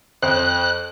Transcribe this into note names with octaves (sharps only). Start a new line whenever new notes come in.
F2 C5 F#6